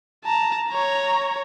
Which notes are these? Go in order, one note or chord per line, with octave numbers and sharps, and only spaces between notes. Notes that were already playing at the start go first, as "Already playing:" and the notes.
A5 A#5
C#5 A#5